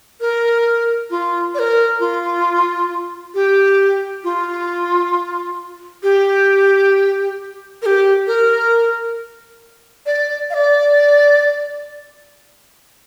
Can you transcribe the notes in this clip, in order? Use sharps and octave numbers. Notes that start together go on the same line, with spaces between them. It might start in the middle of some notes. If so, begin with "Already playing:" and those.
A#4
F4
D5
A#4
F4
G4
F4
G4
A#4
G4
A#4
D5
F5
D5